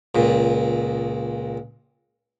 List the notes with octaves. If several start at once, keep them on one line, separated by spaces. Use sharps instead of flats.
C#2 A#2